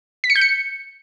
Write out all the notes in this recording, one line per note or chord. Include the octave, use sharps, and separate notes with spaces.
B6
C#7
G6
C#7